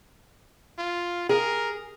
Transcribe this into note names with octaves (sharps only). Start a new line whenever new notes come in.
F4
G#4 A#4